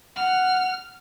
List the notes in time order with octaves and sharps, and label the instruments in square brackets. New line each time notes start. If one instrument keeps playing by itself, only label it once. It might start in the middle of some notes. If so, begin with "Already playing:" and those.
[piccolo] F#5 [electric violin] F6